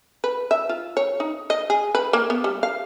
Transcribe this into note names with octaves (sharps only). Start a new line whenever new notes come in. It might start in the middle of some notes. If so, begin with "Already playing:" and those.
B4
E5
F4
C#5
D#4
D#5
G#4
B4
A#3
B3
G3
F5